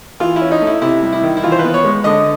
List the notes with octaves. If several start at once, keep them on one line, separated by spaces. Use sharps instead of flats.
E3 F4
E4
C#4
D#4
A3
E4
C3 E4
G3
E4
D#3
E4
E3 F4
C5
B3 B4
C#5
G#3
D3 D#5